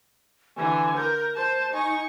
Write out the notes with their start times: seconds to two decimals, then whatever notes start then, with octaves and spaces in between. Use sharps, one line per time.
0.56 D3 E3 G#5
0.96 A#4 G6
1.35 C5 A5 G6
1.73 D#4 G#5 C#6